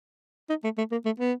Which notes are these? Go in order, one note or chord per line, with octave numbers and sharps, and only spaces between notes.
D#4
A3
A3
A#3
A3
B3